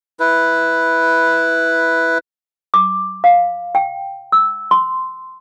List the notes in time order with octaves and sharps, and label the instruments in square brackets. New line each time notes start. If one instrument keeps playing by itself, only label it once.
[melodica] E4 B4
[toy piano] D6
F5
G5
E6
C6